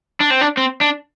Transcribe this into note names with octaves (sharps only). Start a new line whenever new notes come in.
D4
C4
D4
C4
D4